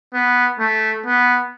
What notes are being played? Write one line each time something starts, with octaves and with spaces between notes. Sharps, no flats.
B3
A3
B3